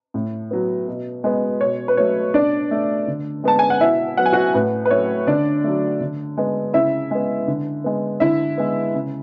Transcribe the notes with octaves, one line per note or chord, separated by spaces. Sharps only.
A2
F#3 B3
B2
G#3 B3
B2 C#5
B4
F#3 A3 C#5
B2 D4 D5
A3
D3
G#3 B3 A5
G#5
F#5
B2 E4 E5
F#3 B3 F#5
G#5
F#4 F#5
A2 B4
B4
F#3 A3 C#5
D3 D4 D5
F#3 A3
D3
G#3 B3
C#3 E4 E5
G#3 B3
D3
G#3 B3
D3 E4 E5
G#3 B3
C#3